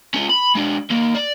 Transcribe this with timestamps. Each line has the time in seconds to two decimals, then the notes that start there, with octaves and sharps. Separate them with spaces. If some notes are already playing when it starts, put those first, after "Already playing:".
0.15 C#4 F4
0.30 B5
0.55 G#3 D4
0.90 D#2 A#3
1.15 D5